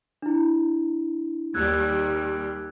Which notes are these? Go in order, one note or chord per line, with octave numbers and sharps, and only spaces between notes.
D4 E4
D#2 G3 E6 F#6 G#6